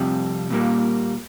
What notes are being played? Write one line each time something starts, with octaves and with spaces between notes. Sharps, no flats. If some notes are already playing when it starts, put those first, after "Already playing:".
Already playing: F2 C3 G3
A#2 G3 A#3